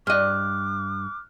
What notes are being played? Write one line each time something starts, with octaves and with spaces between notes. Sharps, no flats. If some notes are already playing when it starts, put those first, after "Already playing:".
G2 D#5 D6 F6 F#6